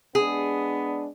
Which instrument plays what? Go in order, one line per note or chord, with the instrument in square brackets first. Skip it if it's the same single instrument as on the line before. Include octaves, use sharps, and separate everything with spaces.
[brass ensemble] G#3 B3 D4 [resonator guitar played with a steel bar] G#4